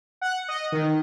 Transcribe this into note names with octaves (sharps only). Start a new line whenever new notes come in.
F#5
D#5
D#3